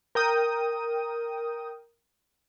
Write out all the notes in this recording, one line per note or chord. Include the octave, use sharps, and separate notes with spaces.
A#4 G5 D#6